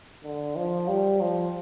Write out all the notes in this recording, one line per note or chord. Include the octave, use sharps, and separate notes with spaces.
D3
F3
G3
F3